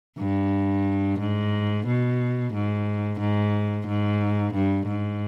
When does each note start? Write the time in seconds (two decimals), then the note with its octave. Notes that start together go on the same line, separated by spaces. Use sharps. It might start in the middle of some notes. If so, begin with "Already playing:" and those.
0.19 G2
1.20 G#2
1.87 B2
2.53 G#2
3.20 G#2
3.87 G#2
4.54 G2
4.87 G#2